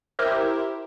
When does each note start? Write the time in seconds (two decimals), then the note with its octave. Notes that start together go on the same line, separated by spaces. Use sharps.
0.19 E4 G4 A#4 C5 E5